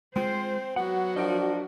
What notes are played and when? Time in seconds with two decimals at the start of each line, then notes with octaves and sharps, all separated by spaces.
0.16 G#3 C4 F4 G#4 C5
0.76 F#3 B3 F#4 F#5
1.16 F3 D4 A#4 D#5